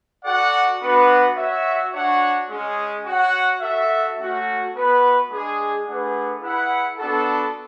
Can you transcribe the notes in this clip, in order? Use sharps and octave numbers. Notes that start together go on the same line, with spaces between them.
F#4 A4 D5 F#5
B3 D4 F#4 B4 F#5
F#4 C#5 E5
D4 F#4 C#5 F#5
G#3 C#4 G#4
F#4 C#5 F#5
F#4 A4 E5
A3 C#4 F#4
B3 F#4 B4
G#3 D4 G#4
A3 D4 G#4 B4 F#5
E4 G#4 B4 F#5
B3 D4 F#4 A4